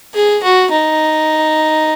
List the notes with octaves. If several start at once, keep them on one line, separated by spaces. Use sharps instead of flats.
G#4
F#4
D#4